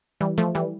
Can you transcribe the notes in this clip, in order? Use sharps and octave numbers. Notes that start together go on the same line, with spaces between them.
E3 G3
F3 A3
E3 G3